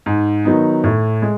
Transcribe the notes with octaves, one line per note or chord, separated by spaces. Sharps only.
G#2
D#3 F#3 B3 D#4
A2
G#3